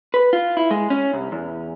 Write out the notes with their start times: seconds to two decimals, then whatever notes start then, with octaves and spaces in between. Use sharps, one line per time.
0.14 B4
0.33 F4
0.57 E4
0.71 G#3
0.90 C#4
1.14 C2
1.32 E2